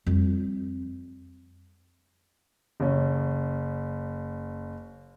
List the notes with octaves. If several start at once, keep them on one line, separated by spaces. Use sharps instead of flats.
F2 G3
F#1 C#4